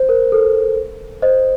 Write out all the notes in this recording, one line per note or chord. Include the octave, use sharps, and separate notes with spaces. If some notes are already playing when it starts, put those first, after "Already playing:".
Already playing: C5
A#4
A4
C5 D#5